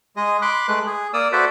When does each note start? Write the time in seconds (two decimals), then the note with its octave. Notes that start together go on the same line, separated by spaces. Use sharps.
0.16 G#3 G#4 D#5
0.42 B5 C6 D6 F#6
0.68 G#3 A3 B4 F#6
0.86 G#4
1.14 A#3 D5 D#6 E6
1.32 F#4 A4 B4 C5 D5 E5